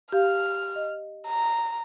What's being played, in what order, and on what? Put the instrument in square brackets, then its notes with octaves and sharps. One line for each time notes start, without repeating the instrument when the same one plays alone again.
[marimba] G4 F5 [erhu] F6
[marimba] D#5
[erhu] A#5